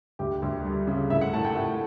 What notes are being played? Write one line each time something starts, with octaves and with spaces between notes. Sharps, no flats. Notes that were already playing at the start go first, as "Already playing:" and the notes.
D2 G4
D2
G3
C#3
A2 E5
F#5
A2 A5
G5
A3 F#5